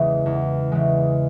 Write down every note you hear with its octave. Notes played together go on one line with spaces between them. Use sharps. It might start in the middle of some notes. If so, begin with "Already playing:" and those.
Already playing: E2 C#3 E3 G#3
E2
C#3 E3 G#3